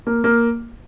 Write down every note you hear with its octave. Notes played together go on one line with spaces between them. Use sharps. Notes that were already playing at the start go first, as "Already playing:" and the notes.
A#3
A#3